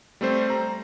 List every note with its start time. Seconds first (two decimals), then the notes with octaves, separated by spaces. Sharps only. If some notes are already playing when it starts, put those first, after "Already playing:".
0.21 G3 A3 C4 C5
0.50 A#5